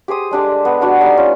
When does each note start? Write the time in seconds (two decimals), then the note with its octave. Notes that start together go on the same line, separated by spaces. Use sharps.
0.08 G4 G#4 C5 D#6
0.31 G#3 D4 G4 A4
0.65 B3
0.81 B3 D4 F#4
1.01 G3 D#4 G#5
1.18 C#4 F4